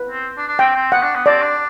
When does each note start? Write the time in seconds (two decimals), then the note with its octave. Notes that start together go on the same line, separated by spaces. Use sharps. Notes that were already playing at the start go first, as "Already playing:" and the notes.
Already playing: B4
0.10 C4
0.37 D4
0.48 D4
0.59 C4 G5
0.76 C4
0.92 B3 F#5
1.03 D4
1.15 B3
1.26 C4 D5
1.42 D4